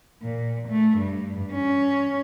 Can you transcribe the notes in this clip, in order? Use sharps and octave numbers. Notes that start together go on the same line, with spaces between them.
A#2
A3
G2
C#4